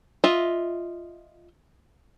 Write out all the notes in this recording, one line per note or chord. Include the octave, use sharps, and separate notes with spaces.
F4 D#5 E5